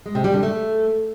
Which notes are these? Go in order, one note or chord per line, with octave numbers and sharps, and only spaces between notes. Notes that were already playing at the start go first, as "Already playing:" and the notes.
G#3
C3
G3
D3
A3